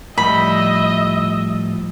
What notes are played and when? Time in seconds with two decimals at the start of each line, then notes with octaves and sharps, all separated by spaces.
0.18 A2 F3 G3 D#5 E5 B5